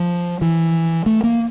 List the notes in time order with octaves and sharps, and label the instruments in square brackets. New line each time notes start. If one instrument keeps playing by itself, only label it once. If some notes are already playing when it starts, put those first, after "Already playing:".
Already playing: [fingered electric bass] F3
E3
A3
A#3